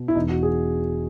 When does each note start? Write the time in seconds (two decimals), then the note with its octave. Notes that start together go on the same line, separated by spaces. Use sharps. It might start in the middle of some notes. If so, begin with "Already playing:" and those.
Already playing: B2
0.08 E4
0.15 E1 D#4
0.29 F#4
0.43 G#4